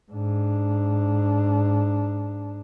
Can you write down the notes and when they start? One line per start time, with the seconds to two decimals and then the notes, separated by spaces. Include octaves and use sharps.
0.12 G#2 D4